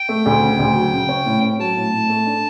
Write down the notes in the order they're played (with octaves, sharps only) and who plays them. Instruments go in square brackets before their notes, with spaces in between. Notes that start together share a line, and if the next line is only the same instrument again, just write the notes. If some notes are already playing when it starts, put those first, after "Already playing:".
Already playing: [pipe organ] G5
[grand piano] A3
D2
C#3
D2
F#3
C#3
C#4
A2
C#4
[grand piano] F#3 [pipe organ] A5
[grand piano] A2
A2
A3
D4